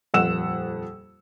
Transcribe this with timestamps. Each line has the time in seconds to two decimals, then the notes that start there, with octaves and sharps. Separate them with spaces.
0.14 D#1 F2 F#5 E6 E7